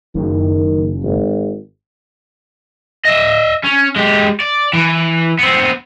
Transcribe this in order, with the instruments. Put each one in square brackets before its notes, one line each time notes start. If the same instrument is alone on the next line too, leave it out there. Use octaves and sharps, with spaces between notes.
[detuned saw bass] F#1 [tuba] D#3
[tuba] G#1
[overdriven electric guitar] D#5 E5
C#4
G#3 G4
D5
E3
B3 C4